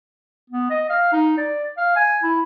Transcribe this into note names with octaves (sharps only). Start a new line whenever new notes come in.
B3
D#5
F5
D#4
D5
F5
G#5
E4